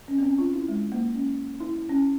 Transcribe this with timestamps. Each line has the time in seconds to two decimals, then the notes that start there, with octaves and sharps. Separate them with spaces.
0.08 C#4
0.18 C4
0.23 C#4
0.38 F4
0.53 E4
0.68 G#3
0.92 A#3
1.15 C#4
1.60 E4
1.75 E4
1.90 C#4